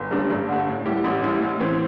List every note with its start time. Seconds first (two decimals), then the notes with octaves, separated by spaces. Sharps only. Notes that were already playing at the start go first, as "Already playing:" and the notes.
Already playing: G1
0.11 G2 G3 D4
0.30 G2
0.49 D3 A3
0.67 A2
0.85 G3 E4 G4
1.04 A1
1.22 A2 G3 E4
1.42 A2
1.60 E3 C4